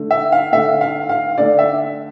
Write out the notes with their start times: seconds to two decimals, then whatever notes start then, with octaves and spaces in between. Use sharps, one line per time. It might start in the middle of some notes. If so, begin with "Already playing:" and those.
Already playing: D3 A3
0.11 E5
0.32 F5
0.52 D3 A3 E5
0.81 F5
1.09 F5
1.38 D3 A3 D5
1.59 E5